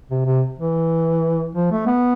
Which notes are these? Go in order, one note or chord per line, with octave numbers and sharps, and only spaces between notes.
C3
C3
E3
F3
A3
B3